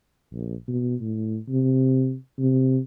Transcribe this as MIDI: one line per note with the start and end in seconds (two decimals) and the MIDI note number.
0.32 0.55 34
0.68 0.95 47
1.01 1.39 45
1.49 2.16 48
2.39 2.79 48